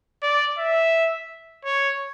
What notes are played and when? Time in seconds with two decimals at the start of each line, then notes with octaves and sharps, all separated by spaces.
0.23 D5
0.58 E5
1.65 C#5